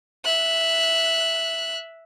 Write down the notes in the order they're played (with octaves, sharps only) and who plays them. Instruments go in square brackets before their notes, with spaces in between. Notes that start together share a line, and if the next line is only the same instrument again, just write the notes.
[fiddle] E5 F#6